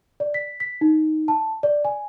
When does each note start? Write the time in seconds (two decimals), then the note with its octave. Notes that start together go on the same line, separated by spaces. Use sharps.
0.20 D5
0.34 B6
0.60 B6
0.81 D#4
1.28 A5
1.63 D5
1.85 G#5